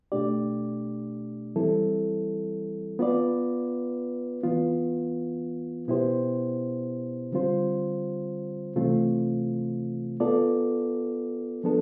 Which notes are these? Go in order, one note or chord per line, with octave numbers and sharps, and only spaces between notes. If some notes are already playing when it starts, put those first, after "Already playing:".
B2 A3 D4 G4 D5
E3 G3 C4 E4 A4
B3 F4 B4 D5
E3 B3 F4
B2 B3 E4 G4 C5
D3 G3 C4 F4 C5
C3 E3 A3 C4 F4
B3 F4 A4 D5
F3 B3 D4 A4